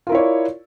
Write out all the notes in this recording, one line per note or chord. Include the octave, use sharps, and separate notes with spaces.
E4 F4 A#4 C#5 D5